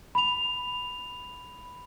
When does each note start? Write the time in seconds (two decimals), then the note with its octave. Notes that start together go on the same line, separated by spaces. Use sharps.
0.15 B5 F7